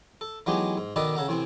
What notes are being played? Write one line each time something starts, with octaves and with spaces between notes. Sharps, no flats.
A4
E3 F#3 G#3 B3 D#4 G4
G#2
B2 D#3 A4 B4 D5 D#5
C#3 A4 F#5 A#5
A2 C3 E3 C4